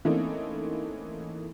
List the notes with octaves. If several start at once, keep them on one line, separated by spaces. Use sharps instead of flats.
E3 A3 A#3 C4 C#4 D#4